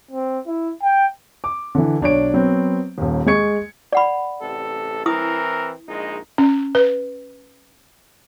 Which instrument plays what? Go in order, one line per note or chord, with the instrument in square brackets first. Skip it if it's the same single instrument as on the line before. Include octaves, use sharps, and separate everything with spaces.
[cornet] C4
E4
G5
[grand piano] D6
D3 E3
B1 D4 C#5 D7
F#3 B3 C4
D#1 D#2
G#3 C#6 G#6 C#7
[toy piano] D5 F#5 B5
[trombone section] A1 C3 A4
[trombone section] E3 C4 A#4 [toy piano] E4 D#6
[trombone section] A#1 G#3 D#4
[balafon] C#4
B4